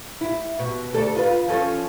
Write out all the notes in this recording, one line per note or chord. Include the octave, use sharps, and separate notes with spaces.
E4
B2
D2 A4 D5
F4 B4
F3 C#4 A4